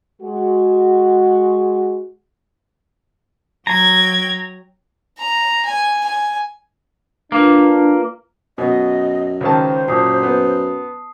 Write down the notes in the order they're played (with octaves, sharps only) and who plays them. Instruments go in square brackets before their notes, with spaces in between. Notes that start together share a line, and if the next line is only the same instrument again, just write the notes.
[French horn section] G#3 F#4
[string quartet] F#3 G5 G#6 [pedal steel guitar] A#5
[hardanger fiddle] A#5
G#5
G#5
[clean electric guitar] A#3 [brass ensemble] D4 [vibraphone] F4 B4
[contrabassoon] F#2 [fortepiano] B2 [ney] D#5
[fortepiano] C#2 D#3 A5 [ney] C5
[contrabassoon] F#2 [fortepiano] A#2 [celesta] A5 D#6 C7
[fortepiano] B3